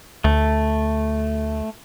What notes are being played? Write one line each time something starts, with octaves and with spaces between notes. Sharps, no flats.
D2 A3